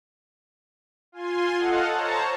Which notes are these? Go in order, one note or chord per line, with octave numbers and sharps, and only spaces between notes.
F4 G#5 C6
A4 D#5 F5 F#5
C5 C#5 A5 A#5